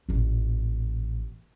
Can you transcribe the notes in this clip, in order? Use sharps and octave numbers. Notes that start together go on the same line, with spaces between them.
A1 A#2